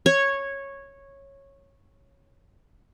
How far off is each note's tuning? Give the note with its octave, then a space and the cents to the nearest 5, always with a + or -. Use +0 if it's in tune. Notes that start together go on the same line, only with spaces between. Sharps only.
C#5 -10